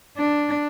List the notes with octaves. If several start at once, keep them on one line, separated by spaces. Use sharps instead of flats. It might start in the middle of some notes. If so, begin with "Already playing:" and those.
D4